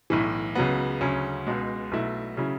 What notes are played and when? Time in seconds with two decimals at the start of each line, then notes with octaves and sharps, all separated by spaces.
0.10 B1 A2 E3
0.55 C#2 C#3 F#3 B3
1.01 D2 C#3 F#3 C#4
1.46 C#2 B2 G#3
1.92 B1 B2 A3 E4
2.37 C#3 F#3 C#4 E4